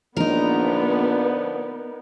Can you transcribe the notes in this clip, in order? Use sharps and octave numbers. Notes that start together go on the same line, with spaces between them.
A#1 D3 F3 B3 D#4 A#4 D5